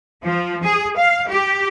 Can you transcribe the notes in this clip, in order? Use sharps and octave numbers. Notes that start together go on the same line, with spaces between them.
F3
G#4
F5
G4